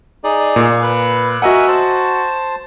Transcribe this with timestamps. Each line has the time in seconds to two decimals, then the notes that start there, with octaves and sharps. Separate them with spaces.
0.24 D#4 G#4 D5
0.56 A#2
0.83 B4 F#6
1.42 F#4 A#4 D#5 E5 F#5 G#5
1.68 C5 A5